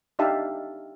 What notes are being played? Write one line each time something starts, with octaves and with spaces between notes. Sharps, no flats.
D4 D#4 G4 E5 F5 A5